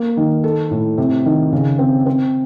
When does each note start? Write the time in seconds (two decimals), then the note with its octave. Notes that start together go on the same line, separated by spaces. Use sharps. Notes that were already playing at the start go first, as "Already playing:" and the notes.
Already playing: A#3
0.17 D#3
0.44 A4
0.71 A2
0.98 C3
1.25 D#3
1.52 C#3
1.79 C4
2.06 C4